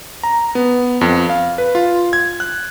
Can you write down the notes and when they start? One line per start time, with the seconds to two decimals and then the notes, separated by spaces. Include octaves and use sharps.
0.23 A#5
0.55 B3
1.01 F2
1.30 F5
1.58 B4
1.75 F4
2.13 G#6
2.40 F#6